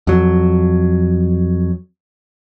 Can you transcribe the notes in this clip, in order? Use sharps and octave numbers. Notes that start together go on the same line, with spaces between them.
F2 F#3